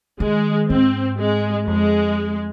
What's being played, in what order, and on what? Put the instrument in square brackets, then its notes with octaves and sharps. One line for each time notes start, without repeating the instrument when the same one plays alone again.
[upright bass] D#3 [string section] G#3
[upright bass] G#2 [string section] C4
[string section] G#3
[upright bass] F2 [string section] G#3